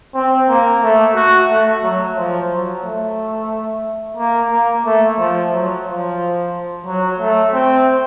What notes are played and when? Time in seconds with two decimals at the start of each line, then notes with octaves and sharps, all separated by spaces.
0.14 C4
0.49 A#3
0.82 A3
1.15 F#4
1.49 A3
1.83 F#3
2.17 F3
2.50 F#3
2.84 A3
4.17 A#3
4.51 A#3
4.85 A3
5.19 F3
5.53 F#3
5.85 F3
6.86 F#3
7.20 A3
7.53 C4